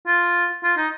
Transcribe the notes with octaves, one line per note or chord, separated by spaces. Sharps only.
F4
F4
D#4